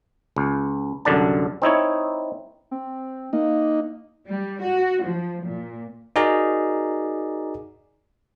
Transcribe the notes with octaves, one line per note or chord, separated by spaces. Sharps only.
C#2
C2 F#2 D3 D4 A5
C4 D#4 E4 C#5
C4
A#3 D#4
G3
F#4
F3
A#2
D#4 F#4 G#4 A#4 D5 A#5